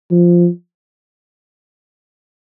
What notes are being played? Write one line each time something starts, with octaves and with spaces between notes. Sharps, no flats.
F3